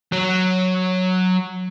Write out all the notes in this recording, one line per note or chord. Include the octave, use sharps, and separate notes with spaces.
F#3